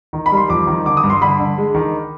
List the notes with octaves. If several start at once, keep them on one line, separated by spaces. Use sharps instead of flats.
D#3
B5
G3
C6
F2 D6
D#3
D3 D6
D#6
G2
C6
D3 B5
D3
G#3
D#3